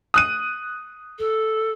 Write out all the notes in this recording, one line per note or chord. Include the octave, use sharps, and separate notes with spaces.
D#6 F#6 D#7
A4